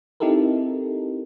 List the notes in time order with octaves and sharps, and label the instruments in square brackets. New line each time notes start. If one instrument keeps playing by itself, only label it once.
[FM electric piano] C4 D#4 E4 G4 A4 A#4